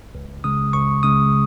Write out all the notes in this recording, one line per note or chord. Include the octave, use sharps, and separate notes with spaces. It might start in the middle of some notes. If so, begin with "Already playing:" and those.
C#2
C#3 G#3 D#6
C#2 C#6
C#3 G#3 D#6